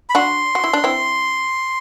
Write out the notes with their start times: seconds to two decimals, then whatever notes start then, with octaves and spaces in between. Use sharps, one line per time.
0.09 B5
0.15 D4 F#4 C6
0.55 F#4
0.64 E4
0.73 D4
0.84 C4 E4